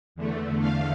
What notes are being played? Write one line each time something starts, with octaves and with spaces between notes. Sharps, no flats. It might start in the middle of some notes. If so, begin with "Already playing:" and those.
E2 D3 A3
F5